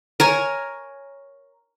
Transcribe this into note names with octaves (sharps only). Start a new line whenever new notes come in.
A#4 C#5 G#5